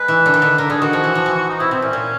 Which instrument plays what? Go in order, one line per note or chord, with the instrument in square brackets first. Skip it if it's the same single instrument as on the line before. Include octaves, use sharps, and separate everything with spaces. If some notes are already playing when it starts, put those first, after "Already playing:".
Already playing: [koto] G#3 [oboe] B4
[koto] E3
D3
D#3
D3
[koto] D3 [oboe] A#4
[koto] D3 [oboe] G#4
[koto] D#3 [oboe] F#4
[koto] F3
E3
F3
E3
[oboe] D#4
[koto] C3 [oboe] E4
[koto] C3 [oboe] C4
[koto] A#2 [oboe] C#4
[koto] A#2